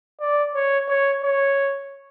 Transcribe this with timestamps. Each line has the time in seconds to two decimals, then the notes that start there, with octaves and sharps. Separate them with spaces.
0.20 D5
0.55 C#5
0.89 C#5
1.24 C#5